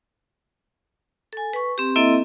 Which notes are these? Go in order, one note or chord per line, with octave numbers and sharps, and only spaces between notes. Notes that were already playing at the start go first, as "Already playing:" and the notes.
A4 G#5
B4 C#6
C4 G4
A#3 C4 E4 A4 D#5 E5